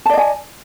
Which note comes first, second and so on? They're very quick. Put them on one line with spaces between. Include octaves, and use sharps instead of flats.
A5 D5 D#5 G#5